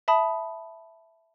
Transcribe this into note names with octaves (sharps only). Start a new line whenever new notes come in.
E5 A5 B5 D#6